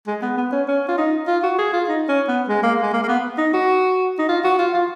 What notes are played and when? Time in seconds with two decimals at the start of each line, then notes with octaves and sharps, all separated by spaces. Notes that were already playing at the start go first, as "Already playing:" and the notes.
0.07 G#3
0.22 B3
0.38 B3
0.52 C#4
0.68 C#4
0.89 F4
0.98 D#4
1.28 F4
1.43 F#4
1.58 G#4
1.73 F4
1.89 D#4
2.09 C#4
2.28 B3
2.48 G#3
2.63 A#3
2.82 G#3
2.93 A#3
3.03 A#3
3.08 B3
3.38 D#4
3.53 F#4
4.19 D#4
4.29 F4
4.44 F#4
4.59 F4
4.74 F4